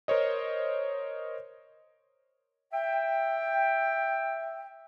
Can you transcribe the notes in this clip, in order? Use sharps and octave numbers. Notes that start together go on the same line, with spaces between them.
A#4 C5 C#5 D#5
E5 G5